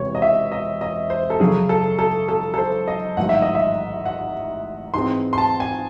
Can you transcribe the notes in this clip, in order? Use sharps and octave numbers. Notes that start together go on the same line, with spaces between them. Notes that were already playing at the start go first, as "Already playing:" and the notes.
Already playing: E1 E2 C3 C#5
D#5
E5
D#5
D#5
C5
A4
F#2 C#3 F#3 C#4 G#4
A4
A4
A4
A4
C5
D#5
A1 G#2 D#3 F#3 F#5
E5
D#5
E5
F#5
G#2 E3 G#3 C4 C6
C6
A5
G#5